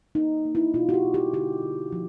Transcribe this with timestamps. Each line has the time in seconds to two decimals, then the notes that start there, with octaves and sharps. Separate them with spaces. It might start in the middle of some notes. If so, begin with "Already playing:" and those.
0.15 A#3 D#4
0.45 A#3
0.55 E4
0.74 B2 F4
0.89 F#4
0.94 G4
1.04 B2
1.14 G4
1.33 D3 G4
1.63 D3
1.92 F3